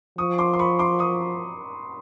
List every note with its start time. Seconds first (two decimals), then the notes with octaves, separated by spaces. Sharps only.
0.18 F3 C#6 D#6
0.38 C6 D6
0.53 C6
0.59 B5 C#6
0.79 C6 D6
0.99 C#6 D#6